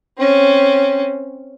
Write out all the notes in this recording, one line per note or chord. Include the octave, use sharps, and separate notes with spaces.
C4 C#4